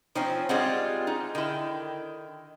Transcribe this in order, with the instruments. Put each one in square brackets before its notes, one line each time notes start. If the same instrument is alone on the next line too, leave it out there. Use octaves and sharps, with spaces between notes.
[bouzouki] F3 C4 C#4 [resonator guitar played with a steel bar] D#4
[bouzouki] G3 G#3 F4 [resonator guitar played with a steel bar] C4 C5 F#5
[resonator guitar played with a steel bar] D#4
[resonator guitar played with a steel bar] D3 E4 [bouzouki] D#3 G5